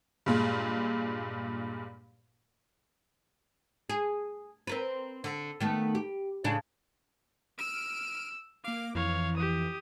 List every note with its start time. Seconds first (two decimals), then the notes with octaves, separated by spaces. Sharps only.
0.26 G2 A#2 G#3
3.90 G#4
4.67 C4 A#4 B4
5.24 D3
5.60 D#3 A3 B3
5.95 G4
6.44 A2 C#3 D4
7.58 E6 F6 D7 D#7
8.64 A#3 F5 D6
8.95 F2 E3 C#5 F5
9.37 G4 D#6